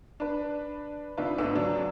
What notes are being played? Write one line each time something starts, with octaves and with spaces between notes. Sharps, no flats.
D4 B4
C3 D4 D#4 F4 B4
G#2 A3 B3 D4 E6
C#3 F#3 D4